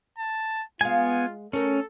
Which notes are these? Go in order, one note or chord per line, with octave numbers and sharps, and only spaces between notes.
A5
G#3 B3 F4 F5 G#5
A3 C#4 A4 A#4